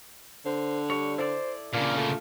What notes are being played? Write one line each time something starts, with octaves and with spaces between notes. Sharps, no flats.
D3 C5
G3 C#5
E4 A4 C5 D5
A#2 C#3 A#3 D4 F4
A3